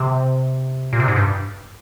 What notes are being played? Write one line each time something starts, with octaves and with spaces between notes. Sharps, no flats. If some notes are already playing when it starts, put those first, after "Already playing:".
Already playing: C3
A#2
C3
G#2
G2